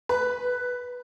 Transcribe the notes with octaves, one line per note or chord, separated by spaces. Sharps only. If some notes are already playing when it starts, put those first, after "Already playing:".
B4